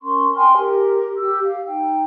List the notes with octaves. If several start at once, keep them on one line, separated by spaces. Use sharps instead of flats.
C#4 A#4 C6 C#6
G5 G#5 C6 F6
G4 A#4
G4 E6
F5
D#4 G5